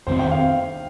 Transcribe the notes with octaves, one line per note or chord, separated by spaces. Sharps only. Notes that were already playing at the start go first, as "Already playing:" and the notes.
F2 D#3 C4 C5
G5
F5